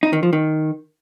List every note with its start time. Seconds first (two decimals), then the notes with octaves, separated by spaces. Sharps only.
0.03 D#4
0.13 D#3
0.23 F3
0.33 D#3